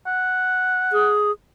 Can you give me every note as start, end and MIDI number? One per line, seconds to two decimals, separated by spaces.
0.07 1.13 78
0.92 1.31 68